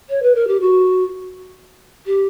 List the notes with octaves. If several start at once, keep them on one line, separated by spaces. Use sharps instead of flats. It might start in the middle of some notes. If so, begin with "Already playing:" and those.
C#5
B4
A#4
G4
F#4
G4